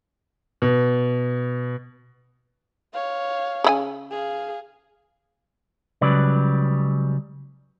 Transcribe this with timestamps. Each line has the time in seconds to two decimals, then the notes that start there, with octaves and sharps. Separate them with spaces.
0.62 B2
2.93 C#5 F5
3.64 C#3 E4 G#5
4.11 G#4 F5
6.01 C#2 C#3 F#3 G3 B4 D5